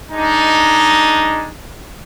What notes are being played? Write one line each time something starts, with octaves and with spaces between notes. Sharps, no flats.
G#3 D4 D#4